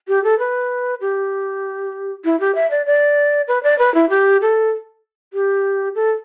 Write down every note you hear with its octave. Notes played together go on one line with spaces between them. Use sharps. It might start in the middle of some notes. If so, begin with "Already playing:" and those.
G4
A4
B4
G4
E4
G4
E5
D5
D5
B4
D5
B4
E4
G4
A4
G4
A4